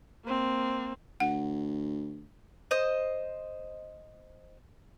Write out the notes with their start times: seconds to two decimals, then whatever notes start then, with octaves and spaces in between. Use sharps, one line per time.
0.24 A#3 C4
1.20 D2 F#5
2.71 C5 D#5